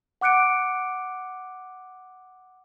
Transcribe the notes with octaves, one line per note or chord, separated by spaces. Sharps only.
F#5 D6 F#6 C#7 D7